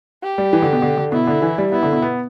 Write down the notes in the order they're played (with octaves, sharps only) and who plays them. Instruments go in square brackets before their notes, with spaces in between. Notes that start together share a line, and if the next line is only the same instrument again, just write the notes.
[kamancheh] G4
[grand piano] G3
E3
D3
B2
D3
D3
[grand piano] B2 [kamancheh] E4
[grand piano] D3
E3
G3
[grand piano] B3 [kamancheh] E4
[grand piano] D3
B2
B3